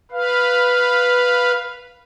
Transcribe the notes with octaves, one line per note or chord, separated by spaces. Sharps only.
B4 F5